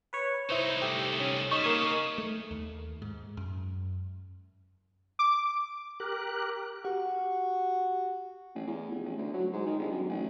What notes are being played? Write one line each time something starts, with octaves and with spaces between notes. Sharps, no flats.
B4 C#5
C2 D#4 E4 C5 C#5
A3 G4
C#4
G3 D#4 C#6 E7
A#3 G#4 F5 D#6
A3
D#2
G#2
F#2
D6
G4 A#4 F#6
F#4 G4
A1
E2
F1
A1
D2
F#3
G#2
D#3
G1
F#2
A1